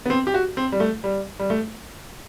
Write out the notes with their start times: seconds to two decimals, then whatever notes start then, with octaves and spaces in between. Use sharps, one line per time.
0.06 B3
0.10 C4
0.27 G4
0.34 F#4
0.57 C4
0.72 G3
0.80 A3
1.04 G3
1.39 G3
1.50 A3